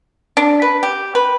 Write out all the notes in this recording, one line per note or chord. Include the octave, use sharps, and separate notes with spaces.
D4
B4
G4
B4